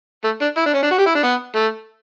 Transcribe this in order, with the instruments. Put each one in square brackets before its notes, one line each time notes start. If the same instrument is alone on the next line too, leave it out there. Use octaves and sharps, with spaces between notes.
[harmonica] A3
D4
E4
D4
C#4
D4
F#4
G4
E4
D4
B3
A3